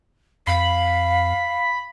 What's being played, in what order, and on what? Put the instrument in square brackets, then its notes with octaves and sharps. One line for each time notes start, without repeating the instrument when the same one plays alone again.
[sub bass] F2 [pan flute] F5 [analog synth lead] B5